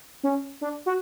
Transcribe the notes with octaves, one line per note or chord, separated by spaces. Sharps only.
C#4
D4
F#4